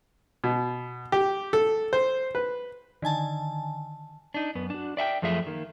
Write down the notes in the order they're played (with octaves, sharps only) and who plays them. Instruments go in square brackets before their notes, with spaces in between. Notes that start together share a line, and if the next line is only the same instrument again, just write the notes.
[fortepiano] B2
G4
A4
C5
B4
[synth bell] D3 D#3 G#5 A5
[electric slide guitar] D4 D#4
F#2 B3
D4 F#4
D5 E5 F#5 G5
F#2 F3 A3 G#4 E5
D#3 A#3